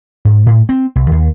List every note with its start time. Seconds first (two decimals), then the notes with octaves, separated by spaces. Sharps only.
0.25 G#2
0.46 A2
0.69 C4
0.96 C2
1.11 D#2